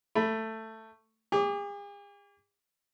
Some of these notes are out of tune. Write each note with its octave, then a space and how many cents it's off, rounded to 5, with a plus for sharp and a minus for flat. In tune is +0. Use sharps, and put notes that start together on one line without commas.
A3 +10 B5 +0
G#4 -45 D6 -20